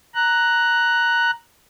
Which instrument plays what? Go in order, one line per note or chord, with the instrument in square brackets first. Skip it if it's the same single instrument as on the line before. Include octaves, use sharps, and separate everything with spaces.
[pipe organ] A#5 F#6